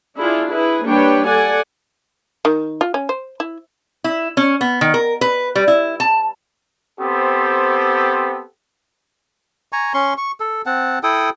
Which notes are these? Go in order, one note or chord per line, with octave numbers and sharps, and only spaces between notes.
D4 E4 F4 G#4
E4 G#4 B4
G3 A#3 D4 B4 C#5 G5
A4 D5 F#5 G#5
D#3
F4
C#4
C5
E4
E4
C#4
B3
D#3
A#4
B4
G3
E4
A5
B3 C4 G4 A4 C5
G#5 A#5 C#6
C#4 C6 C#6
C#6
A4
C4 F#5 A5
E4 A4 G5 D#6